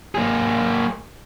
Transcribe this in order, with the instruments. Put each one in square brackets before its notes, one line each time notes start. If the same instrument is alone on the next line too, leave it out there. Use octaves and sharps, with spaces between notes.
[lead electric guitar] A#3 G#4